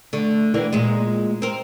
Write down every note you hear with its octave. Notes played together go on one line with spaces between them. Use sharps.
D3 A3
D3 E3 A#3
A#2 G#3
C4 A#4